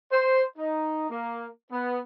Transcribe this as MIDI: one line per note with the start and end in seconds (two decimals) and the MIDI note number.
0.12 0.43 72
0.58 1.07 63
1.10 1.47 58
1.71 1.98 59